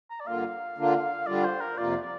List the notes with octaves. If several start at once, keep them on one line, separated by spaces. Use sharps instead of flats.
A#5
D5
G2 D3 A#3 F4 F5
D3 A#3 D4 F4
D3 G3 D4 F4 D5
C5
A#4
F2 C3 A#3 F4 D5
D5